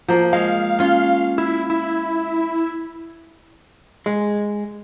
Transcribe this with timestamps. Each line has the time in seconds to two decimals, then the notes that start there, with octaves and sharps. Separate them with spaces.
0.08 F3 A#3
0.33 G#3 F5
0.79 C#4 F4
1.38 E4
1.70 E4
4.06 G#3